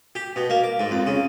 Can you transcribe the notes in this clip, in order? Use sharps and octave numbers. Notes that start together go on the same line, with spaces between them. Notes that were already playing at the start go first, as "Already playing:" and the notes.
G4
B2
A#3
D6
G#2
F2
C#3